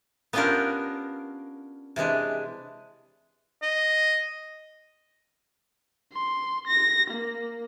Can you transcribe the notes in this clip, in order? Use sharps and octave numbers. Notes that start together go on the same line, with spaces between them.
B3 C#4 D4 F4 G4 A#4
C3 E3 G#3 D4
D#5
C6
A#6
A#3